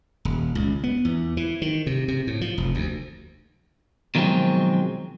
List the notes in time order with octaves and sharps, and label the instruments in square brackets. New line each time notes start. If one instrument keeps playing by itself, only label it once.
[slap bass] D#1
C#2
B3
E2
E3
D#3
C3
C3
A2
F3
F1
D2
[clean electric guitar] B2 D#3 F3 F#3 G#3 C4